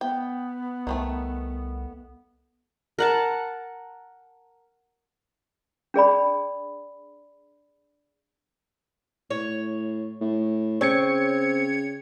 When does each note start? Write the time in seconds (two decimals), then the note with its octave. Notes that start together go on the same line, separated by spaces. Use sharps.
0.01 B3 G5
0.87 C2 D#3 G#3 A3
2.99 A#4 F#5 A5
5.94 D4 G#4 D5 B5
9.30 A2 C#5
10.21 A2
10.81 C#3 C4 C#5 G#6 C#7